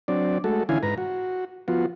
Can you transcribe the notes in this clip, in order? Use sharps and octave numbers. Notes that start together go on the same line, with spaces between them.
F#3 C4 D4 D5
G#3 A3 F#4 A4
D3 E3 C#4 E4 F5 G#5
G#2 B4 A#5
F#4
F3 B3 F4 F#4